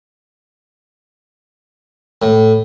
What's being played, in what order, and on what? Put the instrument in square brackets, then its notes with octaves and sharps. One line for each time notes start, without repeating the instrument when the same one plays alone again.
[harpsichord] A2